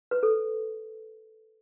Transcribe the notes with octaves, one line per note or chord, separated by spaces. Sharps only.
B4
A4